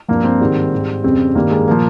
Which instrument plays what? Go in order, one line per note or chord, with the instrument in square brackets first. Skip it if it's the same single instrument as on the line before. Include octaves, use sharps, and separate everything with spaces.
[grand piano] G2 F3 A#3
C4
G#2 D#3 G3
G#2 G3
F2 C#3 G3 C4
G2 D#3 G3 A#3
G#3
A#2 F3 A#3